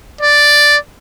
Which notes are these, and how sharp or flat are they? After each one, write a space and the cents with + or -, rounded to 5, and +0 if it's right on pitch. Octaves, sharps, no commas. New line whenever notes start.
D5 +0